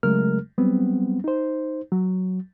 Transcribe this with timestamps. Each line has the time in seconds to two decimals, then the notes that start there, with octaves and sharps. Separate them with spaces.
0.03 C#3 F#3 G#3 A3 A#4 F6
0.58 F#3 G3 B3 C4
1.24 D#4 C5
1.92 F#3